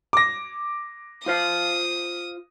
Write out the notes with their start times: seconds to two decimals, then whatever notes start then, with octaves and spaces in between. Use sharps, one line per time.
0.13 D6 A#6
1.26 F4 C5 F5 D#6